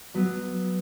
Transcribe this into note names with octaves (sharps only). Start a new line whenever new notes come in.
F#3 B3